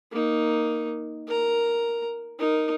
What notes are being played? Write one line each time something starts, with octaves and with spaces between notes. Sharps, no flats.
A#3 D#4
A#4 A#5
D#4 A#4